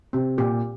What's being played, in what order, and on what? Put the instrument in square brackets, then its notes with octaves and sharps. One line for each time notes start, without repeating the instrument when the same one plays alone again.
[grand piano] C3 [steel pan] C4
[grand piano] A#2 [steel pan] G4